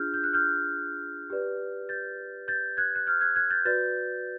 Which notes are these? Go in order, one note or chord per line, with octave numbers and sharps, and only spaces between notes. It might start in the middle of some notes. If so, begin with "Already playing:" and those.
Already playing: D4 F4 G#4 F6 G6
G6
F#6
F6 G6
G4 B4 D5
G6 A6
G6 A6
F#6 G#6
F#6
F6 G6
F#6 G#6
F#6 G#6
G6 A6
F#4 B4 D5 G6 A6